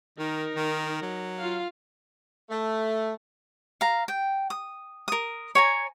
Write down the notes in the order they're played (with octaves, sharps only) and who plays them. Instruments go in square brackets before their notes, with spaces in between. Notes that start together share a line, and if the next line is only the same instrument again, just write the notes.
[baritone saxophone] D#3 [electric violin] D#4 A#4
[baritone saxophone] D#3
F#3
[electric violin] F4 F5
[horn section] A3
[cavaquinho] F5 A#5
G5
D#6
A#4 D#6
C#5 G#5 A#5